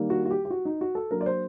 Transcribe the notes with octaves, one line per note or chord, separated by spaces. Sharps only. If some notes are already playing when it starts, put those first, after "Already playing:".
Already playing: D#3 G3 A#3 D#4
F#4
F#4
G4
G4
F#4
D#4
F#4
A4
F#3 A#3 D4 A#4
D5
C5